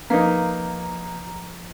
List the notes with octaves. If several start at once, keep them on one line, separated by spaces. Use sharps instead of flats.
F3 A#3 D#4 B4 A#5